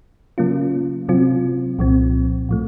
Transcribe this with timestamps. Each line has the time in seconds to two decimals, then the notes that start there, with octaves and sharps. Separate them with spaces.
0.38 C#3 F#3 A#3 C#4 F4
1.09 C3 F#3 C4 F4
1.79 C2 A#2 F3 C4
2.49 A2 F3 A3